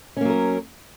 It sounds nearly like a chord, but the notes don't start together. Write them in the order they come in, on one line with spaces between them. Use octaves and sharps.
C#4 A#3 F#3 A#4